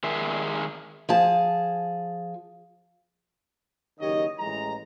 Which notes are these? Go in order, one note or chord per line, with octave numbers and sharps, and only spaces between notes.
D#3 G#3 G#4 E5
F3 G#4 A5
F#1 D#3 G4 C#5 D#5
A1 E3 G#3 A#5